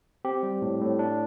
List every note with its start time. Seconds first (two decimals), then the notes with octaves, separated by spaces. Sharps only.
0.25 C4 G4
0.43 G3
0.62 A2
0.81 A2
0.99 D4